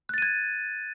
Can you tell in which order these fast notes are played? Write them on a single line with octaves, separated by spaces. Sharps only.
F#6 A6 D#7 G#6